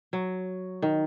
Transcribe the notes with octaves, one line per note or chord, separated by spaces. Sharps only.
F#3
D#3